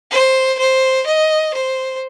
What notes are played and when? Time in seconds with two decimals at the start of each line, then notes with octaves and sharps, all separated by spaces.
0.11 C5
0.59 C5
1.06 D#5
1.54 C5